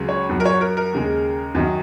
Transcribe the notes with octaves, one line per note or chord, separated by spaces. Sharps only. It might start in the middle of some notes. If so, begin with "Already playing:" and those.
Already playing: C#2 C#3 F#3
C#5
F#2 F#3
A#4
C#5
A#4
A#4
D#2 C#3 G#3
F#2 D#3 F#3